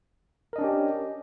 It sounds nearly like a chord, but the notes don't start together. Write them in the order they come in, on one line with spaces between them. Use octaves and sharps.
A#4 D#5 D4 C#4 G4